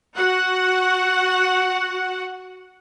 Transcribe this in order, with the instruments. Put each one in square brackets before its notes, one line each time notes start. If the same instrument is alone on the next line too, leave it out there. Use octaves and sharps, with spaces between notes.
[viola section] F#4 F#5